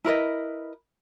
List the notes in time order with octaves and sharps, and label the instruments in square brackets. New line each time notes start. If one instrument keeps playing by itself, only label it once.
[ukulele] E4 A#4 B4 D#5